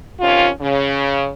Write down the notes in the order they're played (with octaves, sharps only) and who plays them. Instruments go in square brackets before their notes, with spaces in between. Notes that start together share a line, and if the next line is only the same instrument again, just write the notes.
[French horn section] C3 D#3 C#4 F4
C#3